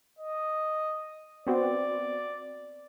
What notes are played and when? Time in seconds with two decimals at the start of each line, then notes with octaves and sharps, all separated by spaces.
0.19 D#5
1.47 B3 C4 F#4 D5